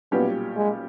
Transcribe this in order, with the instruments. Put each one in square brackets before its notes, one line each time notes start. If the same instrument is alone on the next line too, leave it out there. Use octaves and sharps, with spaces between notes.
[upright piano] B1 A#2 G3 C#4 G4 [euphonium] B3
[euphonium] G#3